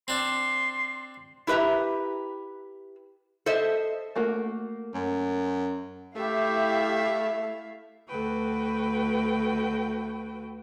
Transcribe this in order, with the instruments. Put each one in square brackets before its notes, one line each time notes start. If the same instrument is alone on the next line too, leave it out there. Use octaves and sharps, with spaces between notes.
[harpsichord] C4 D4 [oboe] C6
[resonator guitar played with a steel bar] E4 G4 B4 E5 A#5
A4 C5 D#5 E5
[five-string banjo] A3 A#3 F#4
[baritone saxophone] F#2
[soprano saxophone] A3 [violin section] E4 E5 F5 [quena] G4
[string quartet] D2 F#4 A4 B4 G5